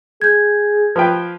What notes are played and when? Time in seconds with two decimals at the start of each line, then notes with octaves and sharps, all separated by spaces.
0.22 G#4 G6 G#6
0.96 F3 B4 G5